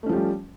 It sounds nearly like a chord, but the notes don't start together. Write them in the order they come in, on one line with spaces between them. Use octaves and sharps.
A3 C#4 F3 G4 G3